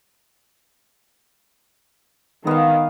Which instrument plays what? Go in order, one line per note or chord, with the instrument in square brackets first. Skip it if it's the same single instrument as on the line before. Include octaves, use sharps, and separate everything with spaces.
[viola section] D#3 [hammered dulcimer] B3 F5